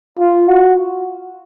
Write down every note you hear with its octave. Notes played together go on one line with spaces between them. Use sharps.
F4
F#4